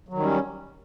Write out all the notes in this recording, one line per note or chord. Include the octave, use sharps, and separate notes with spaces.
D#3 F#3 G3 C#4